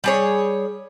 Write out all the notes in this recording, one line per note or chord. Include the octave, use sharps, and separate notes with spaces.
G3 G#4 C#5